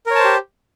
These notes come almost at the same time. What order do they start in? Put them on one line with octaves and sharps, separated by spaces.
A#4 C#5 A5 C5 G4